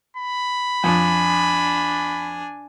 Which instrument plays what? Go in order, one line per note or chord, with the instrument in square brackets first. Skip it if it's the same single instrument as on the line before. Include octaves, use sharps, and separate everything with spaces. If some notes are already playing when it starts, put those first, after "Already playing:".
[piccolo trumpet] B5
[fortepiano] F2 [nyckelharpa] D4 G#5